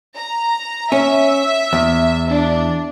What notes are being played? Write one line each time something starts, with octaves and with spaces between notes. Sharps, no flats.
A#5
C#4 E5
E2
D4